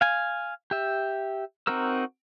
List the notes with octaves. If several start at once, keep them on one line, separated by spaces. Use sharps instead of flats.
F5 G#5
G4 E5
C4 D#4 F#4 A#4 E6